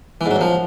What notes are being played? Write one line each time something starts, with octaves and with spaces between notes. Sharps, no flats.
E3
G#2
F#3
F#2
F3